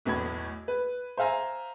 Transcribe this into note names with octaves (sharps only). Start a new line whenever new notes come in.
B1 E2 A2 B5 G#6
B4
C5 E5 F5 G#5 A#5